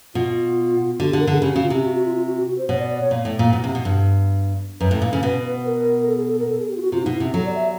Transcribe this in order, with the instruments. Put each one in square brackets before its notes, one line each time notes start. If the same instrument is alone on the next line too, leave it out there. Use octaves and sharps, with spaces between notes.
[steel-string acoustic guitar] B2 [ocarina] F4
[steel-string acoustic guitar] D3 [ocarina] F#4
[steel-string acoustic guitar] D3 [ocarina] G4
[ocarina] A#4
[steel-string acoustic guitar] D3 [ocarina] G#4
[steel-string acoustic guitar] C#3 [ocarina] G4
[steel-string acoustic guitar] C#3 [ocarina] F#4
[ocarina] F4
[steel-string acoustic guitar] C3 [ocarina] G4
[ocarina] F#4
F#4
F4
F4
F#4
F#4
F#4
C5
[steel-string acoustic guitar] B2 [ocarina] C#5
[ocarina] D5
D5
C#5
[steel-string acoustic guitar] A#2
A2
A#2
B2
C3
B2
G2
[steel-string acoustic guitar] F#2 [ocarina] B4
[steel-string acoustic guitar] A2
A#2
C#3
B2
[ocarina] A#4
A4
G#4
A4
A#4
A4
G#4
G4
F4
F#4
[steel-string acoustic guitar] C3 [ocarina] F4
[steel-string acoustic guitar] B2 [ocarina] D#4
[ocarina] E4
[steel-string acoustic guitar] C3
[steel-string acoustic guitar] F#3 [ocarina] A4
[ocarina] D5
E5